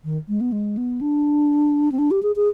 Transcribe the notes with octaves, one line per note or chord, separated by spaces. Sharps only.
D#3
G#3
B3
G#3
B3
D4
C4
D4
G4
G#4
G#4